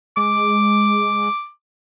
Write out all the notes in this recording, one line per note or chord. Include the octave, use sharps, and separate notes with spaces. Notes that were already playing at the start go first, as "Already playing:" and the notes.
G#3 D6